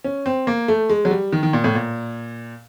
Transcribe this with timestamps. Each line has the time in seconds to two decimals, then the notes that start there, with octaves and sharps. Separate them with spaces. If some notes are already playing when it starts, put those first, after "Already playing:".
0.04 C#4
0.26 C4
0.47 A#3
0.68 A3
0.89 G#3
1.05 F#3
1.11 G3
1.32 D#3
1.43 D#3
1.53 A#2
1.64 A2
1.75 A#2